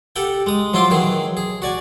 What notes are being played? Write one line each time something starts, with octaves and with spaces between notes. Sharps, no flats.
G4 A4 F#5 G5
G#3 D#6
F3 F#3 E4 F4 C6 D6
D#3 E3 F#3 G#4
G#4
F#4 D5 G#5